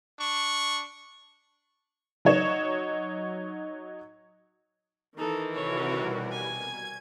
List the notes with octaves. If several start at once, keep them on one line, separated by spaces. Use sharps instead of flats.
D4 C#6
F#3 D#4 C#5 E7
D#3 E3 D#4 A4
C3 F#4 A4 A#4 C#5
B2 G3
G#5 G#6